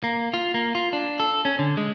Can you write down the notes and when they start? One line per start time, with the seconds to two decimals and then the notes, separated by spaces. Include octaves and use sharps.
0.04 A#3
0.34 F4
0.54 A#3
0.75 F4
0.93 D4
1.20 A4
1.45 C#4
1.59 D3
1.77 G#3